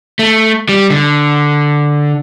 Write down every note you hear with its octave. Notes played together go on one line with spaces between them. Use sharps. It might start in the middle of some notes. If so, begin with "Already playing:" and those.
A3
G3
D3